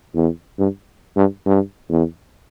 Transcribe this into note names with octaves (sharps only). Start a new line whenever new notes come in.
E2
G2
G2
G2
E2